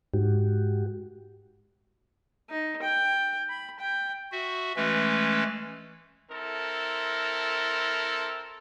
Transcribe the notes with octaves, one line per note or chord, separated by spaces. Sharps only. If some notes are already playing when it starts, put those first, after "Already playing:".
G#2 F#4 G4
D#4
G5
B5
G5
F#4 E5
E3 G#3 A3 C#4 B4
C4 E4 A4 A#4